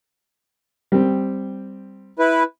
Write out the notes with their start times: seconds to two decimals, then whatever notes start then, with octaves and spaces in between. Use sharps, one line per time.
0.92 G3 C4
2.19 E4 B4